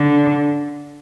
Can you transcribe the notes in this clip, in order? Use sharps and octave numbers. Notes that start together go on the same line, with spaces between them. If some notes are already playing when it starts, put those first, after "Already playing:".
Already playing: D3